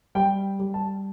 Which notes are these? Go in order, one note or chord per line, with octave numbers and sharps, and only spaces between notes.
G3 G5
G3
A5